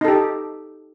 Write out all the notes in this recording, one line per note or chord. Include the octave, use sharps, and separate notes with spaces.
D#4 G4 A4